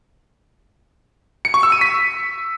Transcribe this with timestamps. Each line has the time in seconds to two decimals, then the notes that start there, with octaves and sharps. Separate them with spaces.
1.45 C#7
1.54 C#6
1.63 E6
1.72 D#7
1.81 B6